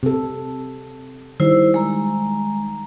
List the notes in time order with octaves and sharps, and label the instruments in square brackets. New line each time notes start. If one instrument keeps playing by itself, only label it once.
[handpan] C3 A4
[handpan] D#3 G3 [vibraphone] E4 C5 E6
[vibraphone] G#3 A#5